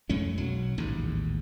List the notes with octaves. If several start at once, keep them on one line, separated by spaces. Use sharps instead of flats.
F2 G#3 A3 C#4
B1 F#3
A1 D#2 G#2